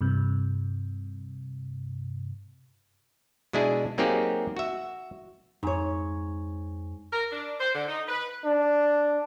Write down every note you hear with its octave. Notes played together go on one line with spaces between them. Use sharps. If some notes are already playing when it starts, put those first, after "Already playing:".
G2 C3
B2 G#3 D4 E4 G#4
F#3 A#3 C4 D#4 G4 G#4
F#4 E5
F2 G#2 C#5 G#5
A#4
D4
C5
D3
D#4
B4
D4